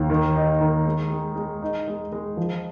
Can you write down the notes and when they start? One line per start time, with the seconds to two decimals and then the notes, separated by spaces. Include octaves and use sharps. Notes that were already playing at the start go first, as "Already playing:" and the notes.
Already playing: D#2
0.10 D#3
0.36 D#4
0.61 D#3
0.86 G#3
1.10 G#3
1.36 G#3
1.62 D#4
1.87 G#3
2.12 G#3
2.37 F3